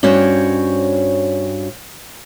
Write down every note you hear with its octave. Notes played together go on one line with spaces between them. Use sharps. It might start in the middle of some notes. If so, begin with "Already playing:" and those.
G2 C#4 F#4 C5 C#5 G5